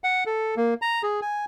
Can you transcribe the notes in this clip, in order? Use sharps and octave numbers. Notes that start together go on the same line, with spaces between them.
F#5
A4
A#3
A#5
G#4
G#5